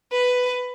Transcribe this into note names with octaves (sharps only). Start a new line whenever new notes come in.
B4